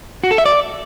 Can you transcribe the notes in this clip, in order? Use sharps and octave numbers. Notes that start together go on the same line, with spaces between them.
F#4
A4
E5
D5